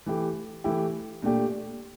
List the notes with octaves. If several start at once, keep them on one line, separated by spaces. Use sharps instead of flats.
E3 A3 E4 G4
E3 A3 E4 G4
A#2 A3 D4 G4